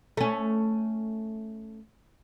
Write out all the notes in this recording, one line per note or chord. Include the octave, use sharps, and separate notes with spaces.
A3 C#4